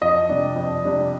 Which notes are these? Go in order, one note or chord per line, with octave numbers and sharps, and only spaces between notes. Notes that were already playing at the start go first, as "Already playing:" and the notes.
F2 D#5
C3 G3 D4
F2
C3 G3 D4